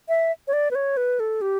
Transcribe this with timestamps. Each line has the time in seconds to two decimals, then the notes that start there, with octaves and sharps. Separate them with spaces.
0.09 E5
0.48 C#5
0.53 D5
0.71 B4
0.75 C#5
0.97 B4
1.20 A4
1.41 G4